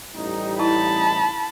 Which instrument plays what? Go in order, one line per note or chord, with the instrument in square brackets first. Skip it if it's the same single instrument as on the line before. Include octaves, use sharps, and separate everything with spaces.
[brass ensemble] A1 G3 D#4
[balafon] E4 [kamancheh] A5 B5